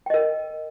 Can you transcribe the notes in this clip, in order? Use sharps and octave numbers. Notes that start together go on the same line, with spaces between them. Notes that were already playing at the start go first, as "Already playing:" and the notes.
A#4 D#5 G5